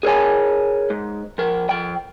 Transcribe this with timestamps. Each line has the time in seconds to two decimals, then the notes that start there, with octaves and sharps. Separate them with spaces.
0.03 G#4 A#4 C#5 G#5
0.90 G#2
1.38 F3 A#4
1.69 F3 G5